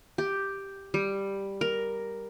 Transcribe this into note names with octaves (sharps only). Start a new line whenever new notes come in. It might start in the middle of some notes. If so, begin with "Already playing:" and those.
G4
G3
A#4